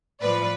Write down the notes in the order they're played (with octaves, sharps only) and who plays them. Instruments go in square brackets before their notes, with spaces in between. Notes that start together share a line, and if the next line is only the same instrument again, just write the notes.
[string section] A2 F3 B4 D5